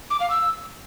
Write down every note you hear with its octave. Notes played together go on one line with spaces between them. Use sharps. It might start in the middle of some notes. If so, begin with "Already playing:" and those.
D6
F5
E6